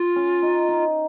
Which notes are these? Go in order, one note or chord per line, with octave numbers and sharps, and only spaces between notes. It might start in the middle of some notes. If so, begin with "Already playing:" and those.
Already playing: F4
C#4
D#4
D#4